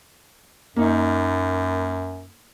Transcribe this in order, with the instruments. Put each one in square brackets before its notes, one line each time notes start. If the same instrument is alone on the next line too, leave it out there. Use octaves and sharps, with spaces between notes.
[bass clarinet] F#2 [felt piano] A#3 D#4